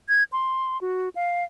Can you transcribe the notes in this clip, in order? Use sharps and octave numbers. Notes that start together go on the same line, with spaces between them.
G#6
C6
F#4
F5